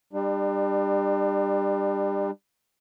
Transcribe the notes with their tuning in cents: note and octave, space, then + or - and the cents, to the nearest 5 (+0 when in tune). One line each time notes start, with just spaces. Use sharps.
G3 +20 D4 +40